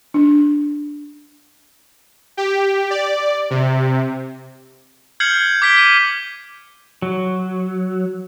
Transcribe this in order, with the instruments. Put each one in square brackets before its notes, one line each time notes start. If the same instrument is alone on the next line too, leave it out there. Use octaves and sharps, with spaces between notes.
[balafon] D4
[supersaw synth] G4
D5
C3
[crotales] F6 G6 G#6 C7 C#7 F#7
D6 G#6 B6 D7 G7
G#6 B6 D#7
[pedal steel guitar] F#3